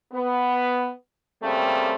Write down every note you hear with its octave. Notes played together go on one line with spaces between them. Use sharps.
B3
C#3 G3 A3 A#3 C4